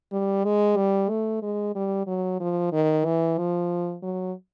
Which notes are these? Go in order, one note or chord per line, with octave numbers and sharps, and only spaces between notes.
G3
G#3
G3
A3
G#3
G3
F#3
F3
D#3
E3
F3
F#3